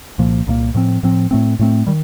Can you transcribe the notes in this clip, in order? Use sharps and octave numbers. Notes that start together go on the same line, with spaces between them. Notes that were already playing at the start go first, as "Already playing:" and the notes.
C2 A#2 F3 A#3
C2 A#2 F3 A#3
A2 F3 C4
A2 F3 C4
A2 A3 C4
A2 A3 C4
D#3 G3